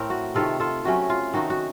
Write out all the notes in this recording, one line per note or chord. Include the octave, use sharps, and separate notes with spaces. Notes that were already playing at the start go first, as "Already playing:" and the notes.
Already playing: A2 A3 C4 A#4
F#4
C3 D#3 A3 F4 A4
F4 A4
C3 F#3 A3 C#4 F#4
F4
D#3 A3 D#4 F#4
F#4